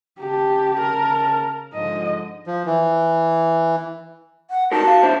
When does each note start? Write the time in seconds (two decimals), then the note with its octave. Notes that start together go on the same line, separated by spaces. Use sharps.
0.20 C#3 G4 A5
0.80 A#4
1.73 G#2 D3 F3 D#5
2.47 F3
2.66 E3
4.50 F#5
4.72 D#4 F#4 A#4 A5
4.84 F#4 F5
5.03 D4 E4 C5